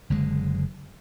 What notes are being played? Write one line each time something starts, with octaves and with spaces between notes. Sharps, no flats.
F#1 D3 G#3